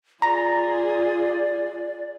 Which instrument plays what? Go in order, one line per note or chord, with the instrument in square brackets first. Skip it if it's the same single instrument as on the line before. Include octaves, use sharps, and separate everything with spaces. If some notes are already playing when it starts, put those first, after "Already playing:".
[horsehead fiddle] F4 G#4 [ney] D5 [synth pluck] A#5 A#6